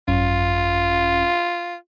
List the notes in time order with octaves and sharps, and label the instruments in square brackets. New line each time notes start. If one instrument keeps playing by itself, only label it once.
[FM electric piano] G#1 F#2 C#4 [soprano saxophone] F4